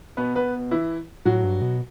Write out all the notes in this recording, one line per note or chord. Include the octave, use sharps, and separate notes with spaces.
B2 B3 B4
B3 B4
E3 E4
A2 F#3 F#4
G2
B2